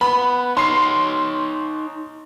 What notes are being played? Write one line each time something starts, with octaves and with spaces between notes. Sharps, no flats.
B3 B5
D#4 C#5 C6 C7